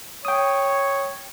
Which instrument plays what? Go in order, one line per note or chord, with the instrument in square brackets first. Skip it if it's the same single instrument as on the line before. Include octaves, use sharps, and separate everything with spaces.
[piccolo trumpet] C#5 [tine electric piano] G5 D#6